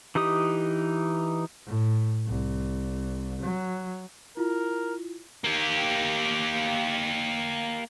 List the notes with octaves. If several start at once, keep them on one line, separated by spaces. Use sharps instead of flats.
E3 D#4 G4 D#6
A2
C2
F#3
E4 F4 A#4
A#3 G4